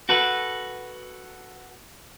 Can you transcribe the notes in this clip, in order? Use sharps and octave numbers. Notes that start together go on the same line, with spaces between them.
F#4 A4 B4